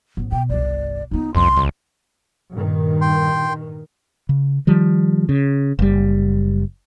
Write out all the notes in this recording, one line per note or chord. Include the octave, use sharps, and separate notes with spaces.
A1 B3
B2 G5
G1 C2 D5
C#2 B3 D#4
C2 F2 C#3 C6
C#2
G2 A#2 D#3
G5 C6
C#3
D#3 F3 G3
C#3
F#1 G3